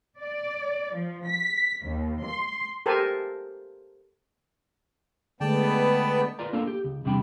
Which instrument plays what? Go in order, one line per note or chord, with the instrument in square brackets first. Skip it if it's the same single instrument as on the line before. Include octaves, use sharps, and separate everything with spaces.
[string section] D5
F3
B6
D#2
C6
[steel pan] G4 A4 A#4 C5 G#5 A5
[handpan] D3 G#3 A3 [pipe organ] B3 [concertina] D5 G5 A5
[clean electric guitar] F4 A#4 B4 D5 A#5
A#3 D4 F4 A4 A#4
G4
C#2
E2 C3 G3 D4 G5 B5